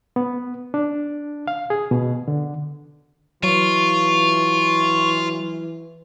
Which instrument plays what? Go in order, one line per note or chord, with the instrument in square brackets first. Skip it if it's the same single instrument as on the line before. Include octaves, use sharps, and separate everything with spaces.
[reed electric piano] B3
D4
F5
G#4
B2
D3
[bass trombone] E3 [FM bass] F#3 [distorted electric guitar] F4 [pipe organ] C#6